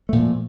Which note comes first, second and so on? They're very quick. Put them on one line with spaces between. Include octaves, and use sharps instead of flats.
A3 A#2 F3